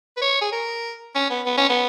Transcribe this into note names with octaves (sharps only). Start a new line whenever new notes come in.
B4
C#5
G#4
A#4
C#4
B3
B3
C#4
B3